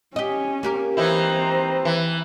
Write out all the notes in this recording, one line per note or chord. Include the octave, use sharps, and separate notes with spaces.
C#4 G4 D#5
A#3 G4 A#4
E3 C4 D#4 E4 C5 A#5
E3